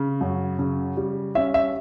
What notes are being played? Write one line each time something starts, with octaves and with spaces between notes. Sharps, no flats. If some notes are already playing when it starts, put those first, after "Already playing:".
Already playing: C#3
F#2
C#3
G3
C#4 E5
E5